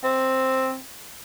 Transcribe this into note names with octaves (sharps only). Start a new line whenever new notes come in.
C4